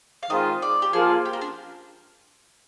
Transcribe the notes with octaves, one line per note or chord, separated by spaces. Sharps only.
F5
D#3 G#3 C4 F4 D#5
D5
G4
F3 A#3 F4 G#4
G4
A#3
D4